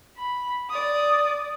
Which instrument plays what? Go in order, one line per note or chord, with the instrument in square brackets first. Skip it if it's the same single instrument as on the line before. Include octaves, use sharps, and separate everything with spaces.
[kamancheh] B5
D5 D#6